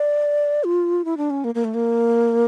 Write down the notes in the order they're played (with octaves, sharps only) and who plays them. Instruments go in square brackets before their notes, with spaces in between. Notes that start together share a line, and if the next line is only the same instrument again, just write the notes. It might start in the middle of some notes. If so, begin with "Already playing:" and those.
Already playing: [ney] D5
F4
E4
D4
C#4
A#3
A#3
A3
A#3